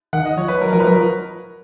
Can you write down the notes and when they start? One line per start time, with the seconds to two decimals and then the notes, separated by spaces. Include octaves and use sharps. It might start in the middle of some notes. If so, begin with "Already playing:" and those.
0.13 D#3 F#5
0.25 D#5
0.37 F3 C#5
0.48 B4
0.61 F#3 A#4
0.72 F3 A#4
0.80 B4
0.84 F#3 A#4
0.96 F3 B4